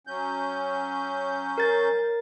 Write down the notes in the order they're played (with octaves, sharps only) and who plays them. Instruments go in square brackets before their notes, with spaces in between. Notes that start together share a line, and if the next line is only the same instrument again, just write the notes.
[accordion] F#3 C#4 G6
[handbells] A#4 A6